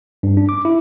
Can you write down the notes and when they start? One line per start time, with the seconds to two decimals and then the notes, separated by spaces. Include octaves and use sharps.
0.23 G2
0.37 D4
0.49 D6
0.65 E4